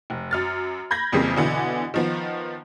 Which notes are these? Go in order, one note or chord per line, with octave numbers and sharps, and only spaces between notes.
F1
F#2 F6 A6
B5 G6 G#6 A#6
F2 C#3 E3 G3 A#3 C4
B2 D3 E3
D#3 F3 B3